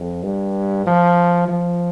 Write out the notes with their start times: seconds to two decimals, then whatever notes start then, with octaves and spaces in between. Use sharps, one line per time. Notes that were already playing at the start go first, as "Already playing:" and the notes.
Already playing: F2
0.23 G2
0.86 F3
1.48 F3